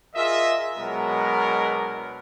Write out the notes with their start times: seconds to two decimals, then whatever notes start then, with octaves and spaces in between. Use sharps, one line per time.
0.15 F4 G#4 A#4 D#5 E5
0.79 B2 F#3 G#3 B3 D4 A#4